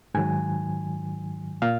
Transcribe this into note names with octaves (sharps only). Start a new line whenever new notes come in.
G#2 D#3 F#3 G#5
A#2 F5